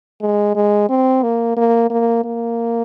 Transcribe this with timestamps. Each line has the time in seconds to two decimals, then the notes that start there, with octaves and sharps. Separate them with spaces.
0.21 G#3
0.55 G#3
0.89 C4
1.23 A#3
1.57 A#3
1.90 A#3
2.24 A#3